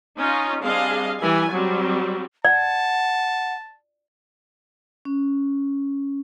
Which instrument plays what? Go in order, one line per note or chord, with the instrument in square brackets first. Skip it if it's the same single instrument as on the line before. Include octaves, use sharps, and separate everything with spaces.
[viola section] C#4 D#4 F4
G3 C4 D4 G#4 D#5 F5
E3 G3 G#5
F#3 G3 C4
[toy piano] D5 [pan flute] F#5 [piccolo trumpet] A5
[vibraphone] C#4